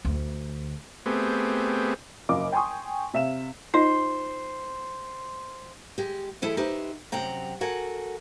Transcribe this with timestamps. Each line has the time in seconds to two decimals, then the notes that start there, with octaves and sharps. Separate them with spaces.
0.05 D2
1.06 A3 B3 C4 G4 G#4
2.29 F#1 F#2 D#5 F5 D6
2.52 G5 G#5 C6 C#6 D#6
3.14 C3 E5 F5 E7
3.74 D#4 F4 C5 D#5
5.98 G#3 G4
6.42 E3 G#3 E4 G4 A4
6.57 D#4 G4 B4 C5 E5
7.12 F#2 C3 F#5 G5 A#5
7.61 F#4 A4 A#4 F#5 G#5